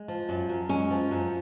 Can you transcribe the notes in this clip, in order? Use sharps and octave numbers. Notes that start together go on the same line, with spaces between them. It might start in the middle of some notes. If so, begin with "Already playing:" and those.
Already playing: G#3
F3
F#2
F#2
G#3 C#4
F3
F#2